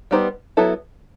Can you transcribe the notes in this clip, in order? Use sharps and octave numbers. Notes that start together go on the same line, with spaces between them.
G3 B3 D#4 G4 C5
F#3 B3 E4 A4